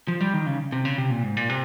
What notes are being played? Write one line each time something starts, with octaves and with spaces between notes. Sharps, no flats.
F3
G3
D#3
C#3
C3
C#3
C3
A#2
G#2
A#2
C3